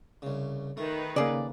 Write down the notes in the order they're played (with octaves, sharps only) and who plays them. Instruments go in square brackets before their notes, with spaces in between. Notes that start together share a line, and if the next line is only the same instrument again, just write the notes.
[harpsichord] C2 C#3
[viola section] D#3 B4 [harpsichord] A3
[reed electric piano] C#3 A#3 [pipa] G#4 D5